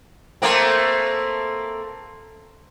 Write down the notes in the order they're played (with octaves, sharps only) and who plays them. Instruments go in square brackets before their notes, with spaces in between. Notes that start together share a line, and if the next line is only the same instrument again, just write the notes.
[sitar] A3 A#3 C4